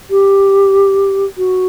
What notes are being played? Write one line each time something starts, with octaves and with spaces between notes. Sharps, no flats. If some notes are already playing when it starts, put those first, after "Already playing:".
G4
F#4